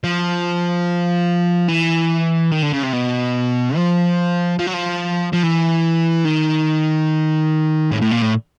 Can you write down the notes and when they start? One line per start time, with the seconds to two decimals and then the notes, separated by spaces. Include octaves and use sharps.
0.04 F3
1.68 E3
2.51 D#3
2.62 D3
2.73 C#3
2.83 C3
2.93 B2
3.76 F3
4.59 F3
4.67 F#3
4.74 F3
5.33 F3
5.43 E3
6.25 D#3
7.92 A2
8.02 A2
8.11 A#2
8.22 A2